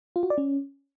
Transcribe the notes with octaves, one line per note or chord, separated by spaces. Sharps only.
F4
F#4
D5
C#4